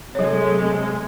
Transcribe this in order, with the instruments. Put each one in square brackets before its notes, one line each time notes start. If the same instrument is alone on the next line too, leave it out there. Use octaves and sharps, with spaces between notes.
[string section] C3 G#3 A3 [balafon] F#3 C#5